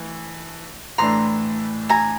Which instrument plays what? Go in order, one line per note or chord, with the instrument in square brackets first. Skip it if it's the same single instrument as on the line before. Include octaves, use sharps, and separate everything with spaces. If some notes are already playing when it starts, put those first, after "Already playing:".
Already playing: [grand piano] E3 A3
[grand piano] A2 E3 A3 D4 [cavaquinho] A#5 C6
[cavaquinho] G#5 A#5